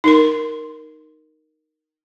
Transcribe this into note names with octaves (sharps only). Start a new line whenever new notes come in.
D#4 A#4 C6